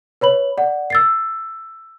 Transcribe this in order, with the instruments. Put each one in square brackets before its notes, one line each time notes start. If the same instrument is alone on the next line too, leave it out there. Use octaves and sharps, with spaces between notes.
[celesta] B4 C#5 B5 F#7
D5 F#5
E6 A6 C7